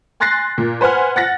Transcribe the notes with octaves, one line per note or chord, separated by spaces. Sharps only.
G#5 C6 F#6 A6 A#6 C7
A#2
B4 C5 F#5 G#5 F6
F#5 A6 A#6